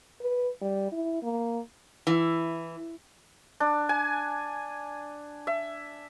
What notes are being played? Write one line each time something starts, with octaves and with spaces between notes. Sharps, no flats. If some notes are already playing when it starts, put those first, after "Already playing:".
B4
G3
E4
A#3
E3
D4
G#5
E5